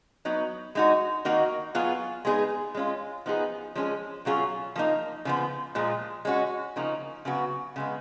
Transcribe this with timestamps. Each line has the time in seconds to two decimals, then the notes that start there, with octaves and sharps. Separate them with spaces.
0.25 F#3 B3 D#4
0.75 G#3 D#4 F#4
1.25 D#3 A#3 D#4 F#4
1.75 F#3 B3 F4 G#4
2.25 G#3 B3 D#4 G#4
2.75 G#3 C#4 F4
3.26 F3 B3 D#4 G#4
3.75 F3 G#3 C#4 G#4
4.25 B2 F#3 C#4 F4 G#4
4.76 F3 A#3 D#4
5.25 C#3 F3 B3
5.75 A#2 F3 G#3
6.25 G#3 C#4 F#4
6.76 C#3 F3 A#3 D#4
7.25 C#3 F#3 B3 F#4
7.76 C#3 G#3 B3